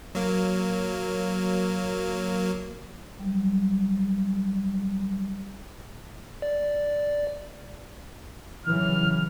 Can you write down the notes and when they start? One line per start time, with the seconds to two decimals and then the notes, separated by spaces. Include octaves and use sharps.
0.15 F#3 A#3
3.19 F#3 G3
6.42 D5
8.66 C#3 E3 F#3 F6